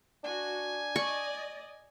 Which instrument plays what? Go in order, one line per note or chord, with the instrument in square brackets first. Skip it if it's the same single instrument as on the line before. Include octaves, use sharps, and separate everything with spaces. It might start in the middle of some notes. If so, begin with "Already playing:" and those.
[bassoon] D4 [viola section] F#4 [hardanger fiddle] G#5
[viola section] D5 D#5 [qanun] C#6